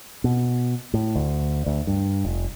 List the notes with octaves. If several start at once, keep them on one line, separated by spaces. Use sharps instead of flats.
B2
A2
D2
D2
G2
F1